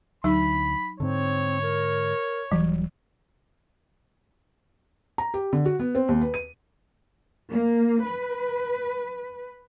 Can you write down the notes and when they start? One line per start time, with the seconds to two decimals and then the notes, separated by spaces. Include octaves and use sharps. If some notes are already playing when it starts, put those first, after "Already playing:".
0.24 D2 F#3 D#4 B5
1.00 G#2 D3 C4 C#5
1.62 A#4
2.52 D#1 E3 F#3 G3
5.18 A#5
5.34 G4
5.53 D3
5.65 F#4
5.80 B3
5.95 C4
6.09 D#2
6.21 B4
6.34 D#7
7.50 A#3
8.03 B4